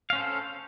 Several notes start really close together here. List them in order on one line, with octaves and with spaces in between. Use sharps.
F5 C#4 C5 A4